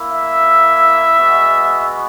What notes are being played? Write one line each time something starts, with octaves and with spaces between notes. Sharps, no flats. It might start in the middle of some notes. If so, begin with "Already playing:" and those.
Already playing: A#3 E4
E5
G#3 B3 F#4